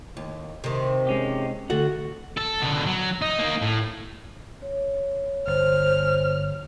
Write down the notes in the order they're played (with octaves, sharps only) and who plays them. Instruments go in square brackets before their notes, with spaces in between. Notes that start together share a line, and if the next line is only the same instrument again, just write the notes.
[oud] D#2
C3 D#3
[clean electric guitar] G#3 C#4 G4
[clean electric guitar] D2 A4 F#5 [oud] F#4
[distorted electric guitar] A4
B2 D3
F#3
D#4
A#3 D#4
A2
[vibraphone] C#5
[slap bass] G1 [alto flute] C5 [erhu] F6